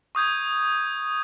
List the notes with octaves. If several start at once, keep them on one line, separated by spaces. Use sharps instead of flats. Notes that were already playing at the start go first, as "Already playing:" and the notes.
C#6 D#6 G6 G#6